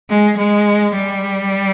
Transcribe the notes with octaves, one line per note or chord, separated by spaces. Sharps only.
G#3
G#3
G3